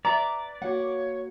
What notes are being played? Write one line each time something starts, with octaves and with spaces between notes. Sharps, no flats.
B4 D5 E5 A#5
A#3 F#4 C#5 F#5